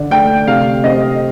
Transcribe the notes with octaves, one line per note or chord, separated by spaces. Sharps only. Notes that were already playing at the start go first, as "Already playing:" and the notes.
Already playing: D3 D4
A3 G5
C3 F5
C4 D#5